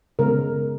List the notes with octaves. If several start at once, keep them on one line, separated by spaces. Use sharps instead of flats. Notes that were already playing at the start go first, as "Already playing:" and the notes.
C#3 G#3 B3 A#4